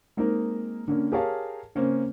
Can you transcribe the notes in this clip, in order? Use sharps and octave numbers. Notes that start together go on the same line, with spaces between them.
G#3 A#3 C4 D#4 A#4
D3 A#3 C#4
G4 G#4 A#4 C#5 F5 A5
C#3 A#3 C4 C#4 C5